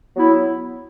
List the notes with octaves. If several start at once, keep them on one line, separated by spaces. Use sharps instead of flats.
F#3 B3 E4